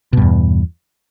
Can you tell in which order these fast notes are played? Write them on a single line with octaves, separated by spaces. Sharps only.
B2 G2 E2